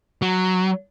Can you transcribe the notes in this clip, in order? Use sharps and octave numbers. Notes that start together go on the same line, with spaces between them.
F#3